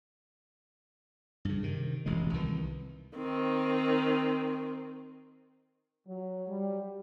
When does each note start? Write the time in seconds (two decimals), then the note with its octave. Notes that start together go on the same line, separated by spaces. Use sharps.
1.45 G2 C#3
1.63 C3 D#3
2.06 E1 A1 D2 G#3
2.34 C2 D#3 E3
3.17 D#3 C4
6.07 F#3
6.49 G3